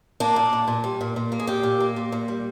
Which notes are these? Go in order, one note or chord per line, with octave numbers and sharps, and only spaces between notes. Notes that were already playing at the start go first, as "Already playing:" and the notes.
A#3 D4
A#2
A#2
A#2
G3
A#2
A#2
A#3
G#4
A#2 G4
A#2
A#3
A#2
A#2
G3